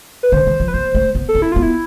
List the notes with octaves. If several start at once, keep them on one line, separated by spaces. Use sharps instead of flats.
B4
D3 C5
D#3
F3
B4
A#3 C5
A3
B3
A4
C4
E4
B3 F4
E4